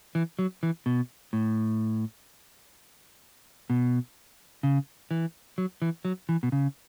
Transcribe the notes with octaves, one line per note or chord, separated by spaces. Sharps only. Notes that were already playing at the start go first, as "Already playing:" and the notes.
E3
F#3
E3
B2
A2
B2
C#3
E3
F#3
E3
F#3
E3
B2
C#3